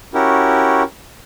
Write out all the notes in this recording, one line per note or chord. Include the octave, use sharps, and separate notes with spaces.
C#4 E4 F#4 G4 A#4